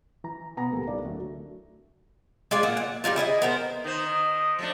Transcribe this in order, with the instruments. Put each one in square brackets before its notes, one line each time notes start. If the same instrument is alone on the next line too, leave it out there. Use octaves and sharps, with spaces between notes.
[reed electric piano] E3 A#5
[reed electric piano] B2 B3 [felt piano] G#5 A#5 A#6
[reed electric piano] C#2 A4 A#4 [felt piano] A#2 G3
[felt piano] D#4 E4 D5
D3 F#3 A3
[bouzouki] G#3 F4 G#4 D5
A#2 A#3 F#5
F#5
G3 A#3 D#4 F4
E4 G#4 C#5 D#5
B3 A#4 C5
[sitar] D#3 C5 [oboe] D#4
[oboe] D#5
[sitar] F3 A3 D4